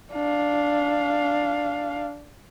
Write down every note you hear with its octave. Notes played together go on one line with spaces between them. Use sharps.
D4 F5